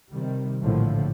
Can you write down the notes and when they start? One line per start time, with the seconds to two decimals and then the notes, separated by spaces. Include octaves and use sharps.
0.11 C3 D#3 G3
0.64 A#1 A2 D3 F3